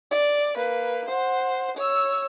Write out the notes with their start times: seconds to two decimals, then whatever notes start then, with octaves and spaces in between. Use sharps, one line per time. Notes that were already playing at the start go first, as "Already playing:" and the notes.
0.11 D5
0.55 A#3 B4
1.09 C5 F#5
1.77 C#5 E6